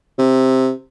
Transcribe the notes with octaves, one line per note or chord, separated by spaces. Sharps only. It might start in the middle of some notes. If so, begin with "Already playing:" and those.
C3